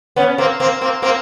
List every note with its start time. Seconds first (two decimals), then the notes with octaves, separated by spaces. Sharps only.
0.16 B3 C#4
0.38 A#3 C4
0.60 A#3 C4
0.81 A#3 C4
1.02 A#3 C4